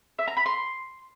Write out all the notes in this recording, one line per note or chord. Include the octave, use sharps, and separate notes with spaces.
E5
A#5
B5
C6